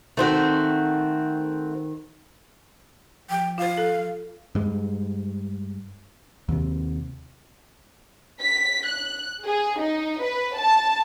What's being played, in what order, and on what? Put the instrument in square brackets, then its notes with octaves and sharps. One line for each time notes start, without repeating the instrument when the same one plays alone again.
[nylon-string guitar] D#3 [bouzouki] A3 C4 F#4
[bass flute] F3 [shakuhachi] G5
[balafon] F4 C5 [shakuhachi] F5
[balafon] A4
[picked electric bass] G2 G#3
D#2 C3
[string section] B6
F#6
G#4
D#4
B4
A5